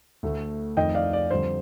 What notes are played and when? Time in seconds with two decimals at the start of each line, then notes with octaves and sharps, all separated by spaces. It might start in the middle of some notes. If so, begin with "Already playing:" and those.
0.23 D2 D3 A3
0.77 F2 D#3 A3 D#5 G5
0.95 D5 F5
1.13 D5
1.31 F2 D3 G3 C5